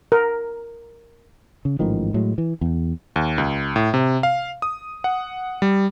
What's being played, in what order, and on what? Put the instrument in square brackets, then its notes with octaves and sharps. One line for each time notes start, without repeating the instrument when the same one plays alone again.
[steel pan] A#4
[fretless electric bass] C#3
A1 G#2 D#3 F3
A2 F#3 G#3
E3
E2
[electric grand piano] D#2
C#2
A2
C3
F5
D#6
F#5
G3